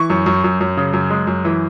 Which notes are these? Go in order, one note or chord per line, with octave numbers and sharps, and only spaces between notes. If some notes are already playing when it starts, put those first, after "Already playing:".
Already playing: E3 C#6
F#2
F#2
F#2
F#2
C#3
F#2
G#3
F#2
E3